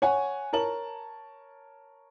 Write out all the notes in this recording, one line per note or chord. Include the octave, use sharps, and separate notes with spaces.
C#5 F#5 G#5
A#4 C#5 A5 F#7